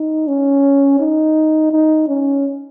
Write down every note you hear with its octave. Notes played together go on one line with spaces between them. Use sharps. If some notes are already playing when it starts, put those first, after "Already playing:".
Already playing: D#4
C#4
D#4
D#4
C#4